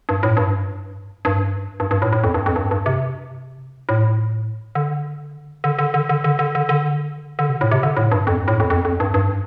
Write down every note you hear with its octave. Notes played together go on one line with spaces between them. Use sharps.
G2
A2
G2
G2
G2
G2
A2
A2
F2
G2
F2
G2
G2
C3
A2
D3
D3
D3
D3
D3
D3
D3
D3
D3
D3
C3
A2
C3
D3
A2
G2
F2
G2
A2
F2
F2
F2
G2
G2